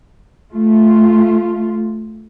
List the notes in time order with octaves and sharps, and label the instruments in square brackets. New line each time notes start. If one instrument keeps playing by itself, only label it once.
[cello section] A3 F4